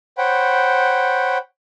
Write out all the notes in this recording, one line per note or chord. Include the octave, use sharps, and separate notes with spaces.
C5 C#5 F#5 G5 B5